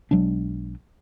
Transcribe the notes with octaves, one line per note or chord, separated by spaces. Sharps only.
B1 F#3 G#3 D4